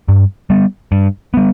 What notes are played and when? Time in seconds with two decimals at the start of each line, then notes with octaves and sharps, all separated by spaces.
0.08 G2
0.50 G3 B3
0.92 G2
1.34 G3 B3